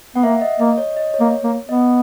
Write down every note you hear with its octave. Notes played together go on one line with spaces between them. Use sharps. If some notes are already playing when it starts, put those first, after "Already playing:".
B3 F#5
A#3 E5
D#5
A#3 D#5
C#5
D#5
C#5
A#3
A#3
B3 D#5